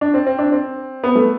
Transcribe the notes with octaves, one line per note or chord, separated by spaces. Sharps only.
D4
C4
C4
D4
C4
B3
A3